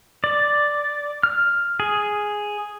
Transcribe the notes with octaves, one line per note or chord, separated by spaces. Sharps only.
D5
F6
G#4